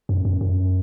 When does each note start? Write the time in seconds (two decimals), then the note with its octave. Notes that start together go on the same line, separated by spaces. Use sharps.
0.09 F#2
0.25 F#2
0.41 F#2